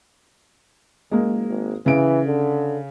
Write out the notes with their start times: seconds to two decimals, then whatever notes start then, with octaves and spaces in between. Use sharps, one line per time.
1.11 F#1 G#3 A#3
1.48 G#1
1.86 C#3 E3 D7
2.26 D3